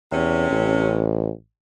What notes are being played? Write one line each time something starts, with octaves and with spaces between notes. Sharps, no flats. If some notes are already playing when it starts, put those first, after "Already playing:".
E2 C3 C#4
A1